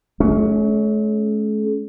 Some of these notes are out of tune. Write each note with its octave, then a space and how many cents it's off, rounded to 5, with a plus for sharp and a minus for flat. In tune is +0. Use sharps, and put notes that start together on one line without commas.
A3 -45 C#4 +15